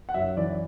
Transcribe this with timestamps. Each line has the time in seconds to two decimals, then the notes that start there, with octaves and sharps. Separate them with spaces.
0.09 F#5
0.14 F#2 E5
0.37 E3 D5